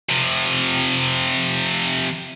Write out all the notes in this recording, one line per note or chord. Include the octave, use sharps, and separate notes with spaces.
C3 F3